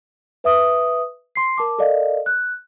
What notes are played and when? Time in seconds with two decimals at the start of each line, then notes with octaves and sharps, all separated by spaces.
0.44 B4 E5 D#6
1.36 C6 C7
1.58 A#4 A5 D6
1.79 A4 A#4 D5 D#5 F5
2.26 F#6